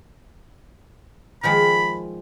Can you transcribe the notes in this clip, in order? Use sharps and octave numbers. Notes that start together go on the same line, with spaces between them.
D#3 F3 G#3 B5